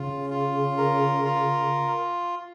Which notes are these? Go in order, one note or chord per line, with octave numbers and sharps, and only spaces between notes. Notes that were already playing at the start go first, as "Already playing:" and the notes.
Already playing: C#3 F4
F4
A#4
F4